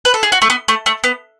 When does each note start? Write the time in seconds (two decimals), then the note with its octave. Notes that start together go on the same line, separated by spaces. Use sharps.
0.05 B4
0.14 A4
0.23 G#4
0.32 F#4
0.42 A3
0.50 B3
0.68 A3
0.86 A3
1.04 B3